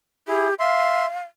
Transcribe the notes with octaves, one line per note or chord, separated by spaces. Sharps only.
E4 G4 G#4
E5 F5 C6